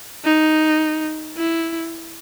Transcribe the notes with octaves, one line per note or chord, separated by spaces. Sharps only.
D#4
E4